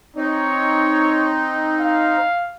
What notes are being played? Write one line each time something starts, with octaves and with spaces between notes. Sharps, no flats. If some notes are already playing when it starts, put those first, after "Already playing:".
C4 D#4 C#5
F5